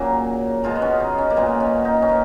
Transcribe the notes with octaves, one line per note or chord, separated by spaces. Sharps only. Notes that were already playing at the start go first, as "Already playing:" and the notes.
Already playing: A#2 C#3 F#3 A#3
B2 G#3 F4
B3
C#4
D#4
C#4
A#3
A#2 G#3 B3
C#4
D#4
C#4
A#2 B3